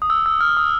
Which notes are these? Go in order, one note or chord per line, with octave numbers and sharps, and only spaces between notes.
D#6
E6
E6
F6
D#6